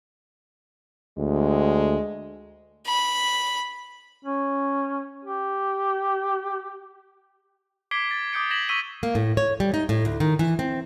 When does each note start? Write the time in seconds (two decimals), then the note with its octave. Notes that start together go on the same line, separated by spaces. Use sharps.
1.18 D2 G#3
2.86 B5
4.25 C#4
5.25 G4
7.91 D6 G#6 B6 C7 D7 G7
8.11 A6
8.33 D6 D#6 G6 C#7 D7
8.51 G#6 A#6 B6 E7 F#7
8.69 C#6 E6 B6 D#7 G7
9.03 A#3
9.15 A2
9.37 C#5
9.60 G3
9.74 D#4
9.89 A2
10.05 D2
10.20 D#3
10.39 E3
10.59 C4